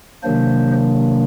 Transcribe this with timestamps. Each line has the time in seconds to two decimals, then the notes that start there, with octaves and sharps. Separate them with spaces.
0.23 C3 D#3 F#3 A#3 D4 C5